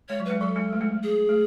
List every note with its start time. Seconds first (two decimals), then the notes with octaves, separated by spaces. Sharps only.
0.09 G#3 C#5
0.20 F#3
0.26 G#3 B4
0.40 F#3 A4
0.56 G#3
0.73 A3
0.81 G#3
0.91 A3
1.03 G#4
1.29 A3